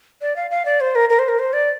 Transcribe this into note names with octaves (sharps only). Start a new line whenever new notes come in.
D5
F5
F5
D5
C5
A#4
A#4
C5
A#4
C5
D5